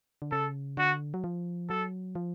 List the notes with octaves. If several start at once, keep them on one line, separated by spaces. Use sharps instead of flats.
D3
C#3 A4
D3 F#4
F#3
F3
F#3 A4
F3